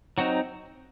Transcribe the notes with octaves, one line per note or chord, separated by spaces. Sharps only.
F#3 C4 D#4 F#4